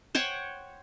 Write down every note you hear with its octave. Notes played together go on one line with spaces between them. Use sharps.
C5 C#5 F#5 G5